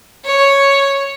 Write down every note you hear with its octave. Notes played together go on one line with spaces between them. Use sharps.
C#5